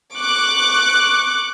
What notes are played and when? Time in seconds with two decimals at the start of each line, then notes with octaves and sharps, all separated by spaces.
0.15 C#6 D6 F#6